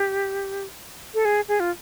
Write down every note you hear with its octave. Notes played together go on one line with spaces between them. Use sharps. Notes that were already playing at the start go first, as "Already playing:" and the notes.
Already playing: G4
A4
G#4
G#4
F4